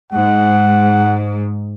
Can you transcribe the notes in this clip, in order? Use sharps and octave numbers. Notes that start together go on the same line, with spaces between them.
G#2 F#5